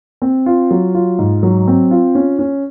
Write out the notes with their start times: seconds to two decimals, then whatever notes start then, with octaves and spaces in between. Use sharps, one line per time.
0.22 C4
0.46 F4
0.71 F#3
0.95 F4
1.19 G#2
1.43 F#3
1.67 C4
1.91 F4
2.15 C#4
2.39 C#4